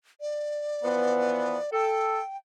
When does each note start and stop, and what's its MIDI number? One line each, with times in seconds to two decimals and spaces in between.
0.21 1.71 74
0.83 1.57 52
0.83 1.57 53
0.83 1.57 59
1.73 2.20 69
1.73 2.37 79